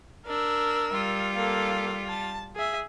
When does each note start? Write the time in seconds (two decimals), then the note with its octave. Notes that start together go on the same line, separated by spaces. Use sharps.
0.26 D4 A#4 E6
0.91 G3 F4
1.36 A#3 A4
2.09 A5
2.55 G#4 E5